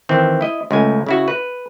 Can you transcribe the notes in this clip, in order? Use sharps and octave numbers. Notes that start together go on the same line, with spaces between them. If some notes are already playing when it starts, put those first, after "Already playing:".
D#3 E3 C4
E4 D#5
C#2 A3 G#5
C#3 E4 F#4
B4